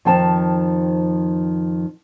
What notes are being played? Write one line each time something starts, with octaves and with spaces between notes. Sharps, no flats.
F2 D#3 F3 G5 A5